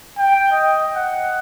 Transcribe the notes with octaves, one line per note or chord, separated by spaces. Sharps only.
G5
D#5
F#5